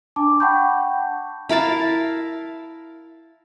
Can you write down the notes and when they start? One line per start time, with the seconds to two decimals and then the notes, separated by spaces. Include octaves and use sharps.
0.16 D4 A5 D6
0.40 F#5 G5 A5 B5 C#6 G6
1.49 E4 A#4 F5 A5